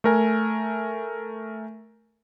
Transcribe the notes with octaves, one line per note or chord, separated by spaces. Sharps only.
A3 A#4 G#5